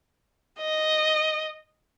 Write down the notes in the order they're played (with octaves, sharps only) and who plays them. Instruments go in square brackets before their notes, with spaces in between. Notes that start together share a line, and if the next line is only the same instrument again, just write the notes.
[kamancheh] D#5